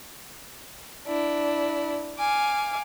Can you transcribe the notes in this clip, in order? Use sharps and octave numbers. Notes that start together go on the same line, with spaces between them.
D4 E4
F5 G#5 D6